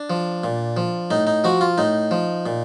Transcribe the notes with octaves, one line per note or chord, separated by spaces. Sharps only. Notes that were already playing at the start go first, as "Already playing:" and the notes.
Already playing: D4
F3
A#2
F3
A2 D#4
D#4
F3 F#4
F4
A2 D#4
F3
A#2